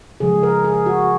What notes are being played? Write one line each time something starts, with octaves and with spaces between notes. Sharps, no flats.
C#3 F3 G#3 G#4
A#4
G#4
F#4